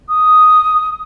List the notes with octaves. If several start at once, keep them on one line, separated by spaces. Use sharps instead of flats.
D#6